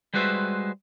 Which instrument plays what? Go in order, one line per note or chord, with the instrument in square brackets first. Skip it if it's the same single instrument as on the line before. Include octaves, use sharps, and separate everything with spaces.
[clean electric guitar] G3 G#3 F#4 B4 C5 E5